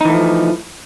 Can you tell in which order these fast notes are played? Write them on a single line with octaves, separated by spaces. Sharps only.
D#4 E3 A3 F3